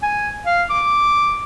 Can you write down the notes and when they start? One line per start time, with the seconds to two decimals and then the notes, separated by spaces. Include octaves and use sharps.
0.03 G#5
0.46 F5
0.70 D6